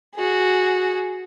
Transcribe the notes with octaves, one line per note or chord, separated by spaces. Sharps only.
F#4 G#4